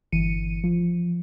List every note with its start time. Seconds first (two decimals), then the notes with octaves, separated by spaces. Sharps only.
0.12 G1 E3 C#7 D#7
0.64 F3